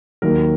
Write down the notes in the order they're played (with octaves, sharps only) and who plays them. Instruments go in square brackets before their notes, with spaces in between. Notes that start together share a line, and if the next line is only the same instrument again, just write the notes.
[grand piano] D#2 D#3 F#3 A#4